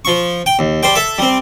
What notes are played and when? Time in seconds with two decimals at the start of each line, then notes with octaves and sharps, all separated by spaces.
0.05 F3 C#6
0.46 G5
0.59 D#2
0.83 G3 C5 G5
0.95 A4 E5
1.18 G3 C4